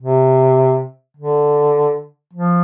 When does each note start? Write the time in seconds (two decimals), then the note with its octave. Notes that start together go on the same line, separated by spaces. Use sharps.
0.01 C3
1.17 D3
2.33 F3